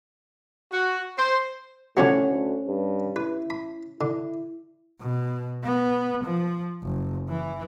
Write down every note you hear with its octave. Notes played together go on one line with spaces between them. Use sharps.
F#4
C5
A2 D3 F3 F#3 C#4 C#5 F#5
D2
G2
E4 B4
B5
D3 E4
B2
B3
F3
F#1
E3